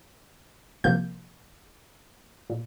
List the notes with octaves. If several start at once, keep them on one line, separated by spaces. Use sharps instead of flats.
C2 C3 F3 A#3 G6
A#2